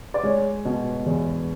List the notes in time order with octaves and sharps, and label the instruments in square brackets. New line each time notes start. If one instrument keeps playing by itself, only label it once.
[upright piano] D5
G#3 C#5
B2
E2